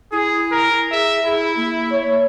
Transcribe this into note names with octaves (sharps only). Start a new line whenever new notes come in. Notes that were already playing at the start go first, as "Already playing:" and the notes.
E4 G#4
A#4
G#4 E5
E4 G#4
A#3
C#5